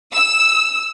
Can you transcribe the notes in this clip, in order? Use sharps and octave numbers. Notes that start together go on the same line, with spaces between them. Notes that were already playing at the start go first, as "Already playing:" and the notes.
E6